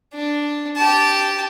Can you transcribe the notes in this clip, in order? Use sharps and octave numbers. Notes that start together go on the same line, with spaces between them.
D4
G4 A5